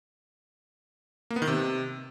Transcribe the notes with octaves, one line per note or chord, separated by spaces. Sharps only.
A#3
B3
D#3
C3